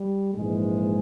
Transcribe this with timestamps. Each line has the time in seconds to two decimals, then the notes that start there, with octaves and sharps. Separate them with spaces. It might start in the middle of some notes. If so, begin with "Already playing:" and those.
Already playing: G3
0.34 A#1 G#2 E3 G#3